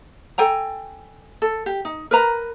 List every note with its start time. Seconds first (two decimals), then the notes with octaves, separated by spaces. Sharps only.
0.38 A4 G5 G#5 A#5
1.42 A4
1.66 G4
1.85 D#4
2.11 A#4 B4 A#5